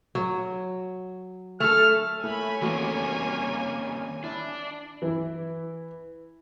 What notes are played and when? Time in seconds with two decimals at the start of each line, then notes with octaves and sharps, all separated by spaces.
0.15 F#3
1.60 A3 A4 F6
2.24 A3 A#3 E4 A4 C#5 G#5 B5
2.62 D#3 E3 G3 A3 A#3 C4 C#4 F#4
4.24 D4 E4
5.02 E3 E4